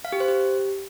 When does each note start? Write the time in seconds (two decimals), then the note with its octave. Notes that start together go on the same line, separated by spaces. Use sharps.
0.05 F5
0.12 G4
0.20 C5
0.28 G4